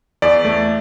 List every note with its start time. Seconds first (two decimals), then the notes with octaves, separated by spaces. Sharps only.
0.22 E2 D5
0.45 A3